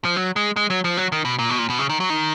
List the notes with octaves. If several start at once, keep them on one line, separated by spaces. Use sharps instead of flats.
F3
F#3
G#3
G#3
F#3
F3
F#3
D#3
B2
A#2
B2
A#2
B2
C#3
D#3
F#3
D#3